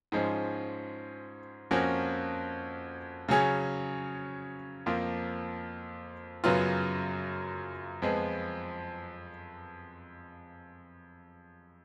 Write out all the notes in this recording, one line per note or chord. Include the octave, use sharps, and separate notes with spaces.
G#2 F3 G#3 C#4
F2 F3 A#3 C#4 F#4
C#3 F#3 C#4 G#4
F2 F3 A#3 F4
F#2 C#3 F#3 B3 F4
F2 F3 G#3 B3